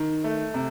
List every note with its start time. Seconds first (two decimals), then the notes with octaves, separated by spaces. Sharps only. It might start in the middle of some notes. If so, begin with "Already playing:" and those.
Already playing: D#3
0.24 A3
0.54 C3